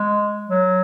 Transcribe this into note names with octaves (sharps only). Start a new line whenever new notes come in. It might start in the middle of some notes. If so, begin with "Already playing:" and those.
Already playing: G#3
F#3